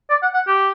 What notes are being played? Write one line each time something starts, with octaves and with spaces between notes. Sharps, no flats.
D5
F#5
F#5
G4